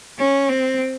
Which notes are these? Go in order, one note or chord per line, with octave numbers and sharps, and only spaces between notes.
C#4
C4